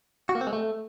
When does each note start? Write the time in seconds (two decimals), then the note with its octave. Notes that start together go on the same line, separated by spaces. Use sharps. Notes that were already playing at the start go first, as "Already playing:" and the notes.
0.29 F#4
0.35 A#3
0.41 C4
0.47 G#3
0.53 A3